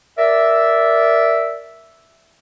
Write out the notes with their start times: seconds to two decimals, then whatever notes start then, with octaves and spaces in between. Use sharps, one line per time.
0.18 A#4 D5 E5